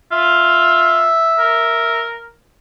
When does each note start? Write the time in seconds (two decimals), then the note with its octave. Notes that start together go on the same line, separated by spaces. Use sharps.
0.12 F4 E5
1.39 A#4